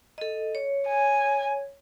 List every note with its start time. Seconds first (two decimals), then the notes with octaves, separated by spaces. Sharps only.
0.18 A4 D#5
0.55 C#5
0.88 G#5